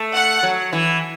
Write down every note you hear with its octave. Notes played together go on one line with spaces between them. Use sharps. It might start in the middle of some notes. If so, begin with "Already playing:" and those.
Already playing: A3
F#5
F#3
E3